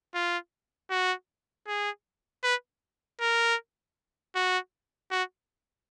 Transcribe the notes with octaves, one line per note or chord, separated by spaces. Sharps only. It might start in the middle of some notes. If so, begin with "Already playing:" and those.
F4
F#4
G#4
B4
A#4
F#4
F#4